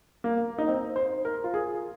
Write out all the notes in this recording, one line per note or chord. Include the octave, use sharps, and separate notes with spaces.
A#3
D#4
C4
C5
A#4
F4
G#4